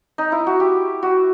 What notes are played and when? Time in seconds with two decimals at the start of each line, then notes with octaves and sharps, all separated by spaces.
0.18 D#4
0.32 E4
0.47 F#4
0.60 G4
1.03 F#4